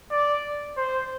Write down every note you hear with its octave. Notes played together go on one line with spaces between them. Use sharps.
D5
C5